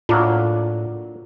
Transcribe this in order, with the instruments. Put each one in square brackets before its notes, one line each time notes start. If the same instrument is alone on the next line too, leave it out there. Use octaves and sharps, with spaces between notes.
[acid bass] A2 [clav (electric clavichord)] F#3 A#3 D4 [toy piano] F4